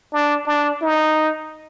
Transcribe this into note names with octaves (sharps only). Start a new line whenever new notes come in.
D4
D4
D#4